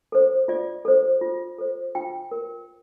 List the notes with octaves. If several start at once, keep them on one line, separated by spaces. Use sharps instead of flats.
A4 C5
F4 D5
A4 C5
F4
A4 C5
F4 G5
A#4